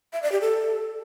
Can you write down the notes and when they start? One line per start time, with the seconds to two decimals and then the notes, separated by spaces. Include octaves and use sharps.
0.13 E5
0.22 D5
0.32 G4
0.41 A4